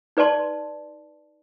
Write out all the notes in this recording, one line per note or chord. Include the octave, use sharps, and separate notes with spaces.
D#4 B4 D5 A5 C6